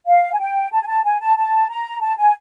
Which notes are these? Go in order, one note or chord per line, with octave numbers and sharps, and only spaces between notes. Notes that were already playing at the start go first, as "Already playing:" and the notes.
F5
G#5
G5
A5
G#5
A5
G#5
A5
A5
A#5
A5
G#5